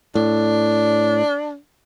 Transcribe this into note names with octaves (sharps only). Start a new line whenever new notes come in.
A2 D4